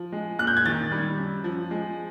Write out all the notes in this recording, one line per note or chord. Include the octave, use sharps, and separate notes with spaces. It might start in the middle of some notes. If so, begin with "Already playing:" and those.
Already playing: F3
G#3
A#2 F#6
G6
G#6
D#3 A6
G3
F#2
F3
G#3